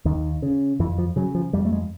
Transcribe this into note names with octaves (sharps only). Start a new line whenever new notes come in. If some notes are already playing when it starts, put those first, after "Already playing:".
D#2 D#3
C#3
F2 E3
F3
C#3 F#3
F3
F2 G3
A3
G#3